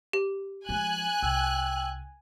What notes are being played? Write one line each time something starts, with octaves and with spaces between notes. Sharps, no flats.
G4
F3 G#3 G#5 F#6
C2 G5 E6